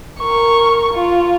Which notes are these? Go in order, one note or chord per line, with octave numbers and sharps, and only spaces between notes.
A#4 C#6
F4